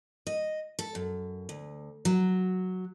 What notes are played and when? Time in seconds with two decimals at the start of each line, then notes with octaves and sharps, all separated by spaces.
0.27 D#5
0.79 A4
0.95 F#2
1.49 D2
2.05 F#3